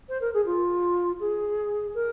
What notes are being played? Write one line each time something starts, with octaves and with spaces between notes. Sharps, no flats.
C5
A#4
G#4
F4
G#4
A#4